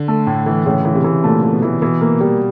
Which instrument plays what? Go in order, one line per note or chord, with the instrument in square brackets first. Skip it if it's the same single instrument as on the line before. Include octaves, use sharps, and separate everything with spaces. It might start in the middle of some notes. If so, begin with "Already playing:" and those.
Already playing: [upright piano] D3
[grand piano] A3
A2
E3
[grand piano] A2 [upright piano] C#3
[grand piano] E3
[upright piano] C3
[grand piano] E3
[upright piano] A#2 [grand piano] A3
[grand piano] E3
[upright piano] B2
[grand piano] E3
[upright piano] B2 [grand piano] E3
[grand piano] A#3
G3